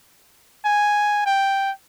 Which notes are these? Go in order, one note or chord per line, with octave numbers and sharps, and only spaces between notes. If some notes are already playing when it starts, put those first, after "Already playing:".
G#5
G5